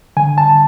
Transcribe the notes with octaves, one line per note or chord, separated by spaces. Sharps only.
D3 G#5
A5